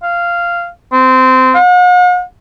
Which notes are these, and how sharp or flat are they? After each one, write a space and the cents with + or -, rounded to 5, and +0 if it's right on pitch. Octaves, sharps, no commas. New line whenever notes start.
F5 -10
C4 -20
F#5 -45